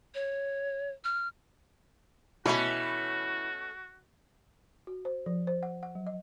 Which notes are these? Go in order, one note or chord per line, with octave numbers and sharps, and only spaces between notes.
C#5
F6
B2 E3 A3 C#4 F#4 B4
F#4
C5
F3
C5
F#5
F#5
F#3
D#5